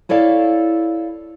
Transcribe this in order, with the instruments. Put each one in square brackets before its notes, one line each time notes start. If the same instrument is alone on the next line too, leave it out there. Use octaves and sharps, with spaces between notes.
[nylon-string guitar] E4 A4 C#5 D5 F5